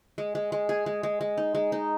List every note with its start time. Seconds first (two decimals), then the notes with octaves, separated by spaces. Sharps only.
0.18 G#3
0.35 G#3
0.52 G#3
0.69 G#4
0.86 G#3
1.03 G#3
1.21 G#3
1.37 D#4
1.55 G#3
1.72 D#4